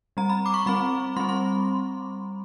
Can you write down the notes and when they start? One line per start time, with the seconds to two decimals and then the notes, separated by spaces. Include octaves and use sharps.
0.17 G3 C4 A#5
0.30 B5
0.46 D6
0.54 C#6
0.66 G3 C4 B5
1.16 G3 C4 C6
1.29 C6